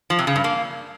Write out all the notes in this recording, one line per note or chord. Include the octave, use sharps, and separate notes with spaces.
F3
C3
C#3
G2
A#3